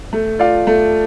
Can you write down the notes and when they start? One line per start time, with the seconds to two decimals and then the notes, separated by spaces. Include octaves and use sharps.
0.13 A3
0.39 F4 D5 F5
0.67 A3